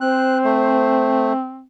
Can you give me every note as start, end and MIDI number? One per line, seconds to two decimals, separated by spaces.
0.01 1.67 60
0.01 1.33 72
0.01 0.38 90
0.44 1.33 57